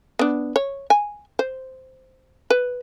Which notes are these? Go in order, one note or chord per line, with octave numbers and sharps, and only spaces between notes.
B3 D4
C#5
G#5
C5
B4